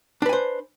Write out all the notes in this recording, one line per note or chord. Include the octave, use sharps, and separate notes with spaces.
D4 B4 C5 G#5